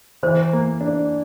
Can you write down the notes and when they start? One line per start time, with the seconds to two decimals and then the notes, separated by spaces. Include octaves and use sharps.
0.23 E3 C5
0.52 A#3
0.81 D4